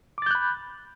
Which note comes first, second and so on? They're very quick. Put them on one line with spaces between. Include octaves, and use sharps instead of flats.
D6 A6 G6 F#6 B5